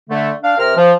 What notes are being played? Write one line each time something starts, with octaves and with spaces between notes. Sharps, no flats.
D3 A3
D4 F5
C3 A#4 F6
F3